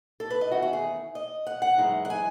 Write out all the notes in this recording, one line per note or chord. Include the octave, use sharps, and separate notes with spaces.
A4
B4
D#5
E2 D#3 A3 C#4 F#4
F#4
G#4
D#5
F#5
F#5
F#2 E3 G#3 D#4
F#5
G#5